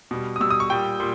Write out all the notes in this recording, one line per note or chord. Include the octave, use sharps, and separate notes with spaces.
B2 G3
D#6
B2 G3 E6
D#6
C#6
A#2 G3 G5
A#2 G3